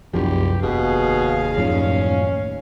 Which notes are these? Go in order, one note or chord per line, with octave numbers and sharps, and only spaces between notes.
E1 C2 F#2 F3 G4
F1 D#2 B2 G#4 F5
D#1 F#2 A2 F3 C#4